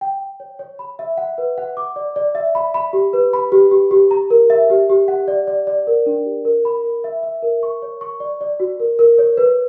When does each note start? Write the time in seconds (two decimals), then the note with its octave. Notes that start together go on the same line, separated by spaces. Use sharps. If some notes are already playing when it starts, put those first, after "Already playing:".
0.01 G5
0.21 G5
0.40 C#5
0.59 C#5
0.79 B5
0.99 E5
1.17 F#5
1.38 B4
1.58 F#5
1.77 D6
1.96 D5
2.16 D5
2.35 E5
2.55 B5
2.74 B5
2.93 G4
3.13 B4
3.33 B5
3.52 G4
3.71 G4
3.91 G4
4.11 A#5
4.30 A#4
4.50 E5
4.70 G4
4.90 G4
5.08 F#5
5.28 D5
5.47 D5
5.67 D5
5.87 A#4
6.06 D4
6.25 G4
6.45 A#4
6.65 B5
6.84 A#4
7.04 E5
7.23 E5
7.43 A#4
7.63 C#6
7.82 C#5
8.01 C#6
8.20 D5
8.41 D5
8.60 F#4
8.80 A#4
8.99 A#4
9.18 C#5
9.37 B4